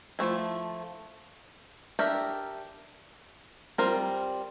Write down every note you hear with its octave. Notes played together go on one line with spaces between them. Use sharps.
F3 A3 E4
D4 G4 A#4 E5
G3 C4 F4 A#4